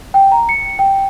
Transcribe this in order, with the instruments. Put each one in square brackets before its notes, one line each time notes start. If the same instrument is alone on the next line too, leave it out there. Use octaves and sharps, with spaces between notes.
[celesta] G5
A#5
C#7
G5